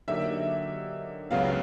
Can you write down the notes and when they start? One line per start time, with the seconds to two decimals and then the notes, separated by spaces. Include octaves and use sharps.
0.08 D3 F#3 A#3 D#4 G4 E5
1.31 C#2 C#3 F#3 B3 F5